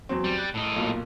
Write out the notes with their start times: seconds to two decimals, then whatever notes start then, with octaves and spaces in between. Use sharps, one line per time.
0.09 E2 F#3 C4
0.24 G3
0.39 F#6
0.54 A2 D#4
0.76 B1 A#2